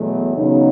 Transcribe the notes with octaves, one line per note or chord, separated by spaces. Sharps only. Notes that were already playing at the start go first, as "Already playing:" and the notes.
Already playing: E2 B2 F#3 A3
E2 C#3 F#3 B3 D#4